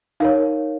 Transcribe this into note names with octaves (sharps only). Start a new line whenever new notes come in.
D#4 A#4 C#5 F5